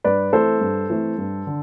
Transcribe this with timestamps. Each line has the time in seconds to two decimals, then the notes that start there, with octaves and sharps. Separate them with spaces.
0.04 G2 B4 D5
0.33 E3 A3 C4 A4 C5
0.61 G2
0.90 E3 A3 C4
1.18 G2
1.47 D3